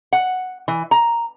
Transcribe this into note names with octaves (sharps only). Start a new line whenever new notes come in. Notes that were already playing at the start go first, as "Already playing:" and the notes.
F#5
E3
A#5